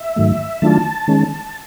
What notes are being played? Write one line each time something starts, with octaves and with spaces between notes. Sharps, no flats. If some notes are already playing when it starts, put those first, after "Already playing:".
Already playing: E5
G#2 D#3 F#3 A3
D#3 F#3 A3 D4 F4 A5
D#3 G#3 C#4